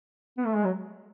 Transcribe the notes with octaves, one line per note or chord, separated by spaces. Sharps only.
B3
A3
G#3
F#3